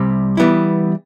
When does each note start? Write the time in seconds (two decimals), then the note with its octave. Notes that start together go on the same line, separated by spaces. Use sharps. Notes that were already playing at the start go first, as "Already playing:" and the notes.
Already playing: C2 C3 G3
0.37 E3 G3 B3 E4